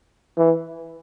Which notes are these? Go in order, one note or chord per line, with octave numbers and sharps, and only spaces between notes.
E3